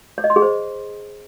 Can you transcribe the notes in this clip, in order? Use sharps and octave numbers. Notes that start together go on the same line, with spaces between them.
C#5
D#5
C6
G#4
C5